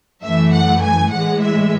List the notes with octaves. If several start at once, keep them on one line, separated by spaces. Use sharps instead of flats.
F#2 E3 A3 E5
F#5
G#5
A2 E3 G#3 F#5
E5